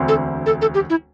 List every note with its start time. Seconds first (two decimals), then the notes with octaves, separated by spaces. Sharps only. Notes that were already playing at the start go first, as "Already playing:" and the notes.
Already playing: E1 D2 D3 C4
0.08 A4
0.46 A4
0.61 A4
0.74 G4
0.90 E4